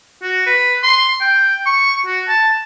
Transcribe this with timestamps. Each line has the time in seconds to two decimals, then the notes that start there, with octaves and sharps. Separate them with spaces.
0.22 F#4
0.46 B4
0.83 C6
1.20 G5
1.66 C#6
2.06 F#4
2.28 A5